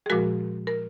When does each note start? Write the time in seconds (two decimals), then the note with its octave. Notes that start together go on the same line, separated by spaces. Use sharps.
0.06 G#4
0.10 A#2 F3 G#3 F#4 A#4
0.67 A#4